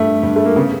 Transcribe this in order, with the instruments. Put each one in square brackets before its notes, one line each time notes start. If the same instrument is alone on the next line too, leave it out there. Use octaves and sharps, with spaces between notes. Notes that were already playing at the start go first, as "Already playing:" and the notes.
Already playing: [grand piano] G2 G3 [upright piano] A3
[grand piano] G2
[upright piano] A3
A#3
[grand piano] C#3 [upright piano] B3